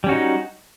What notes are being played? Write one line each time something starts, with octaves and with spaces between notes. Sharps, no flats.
G3 C#4 D#4 F#4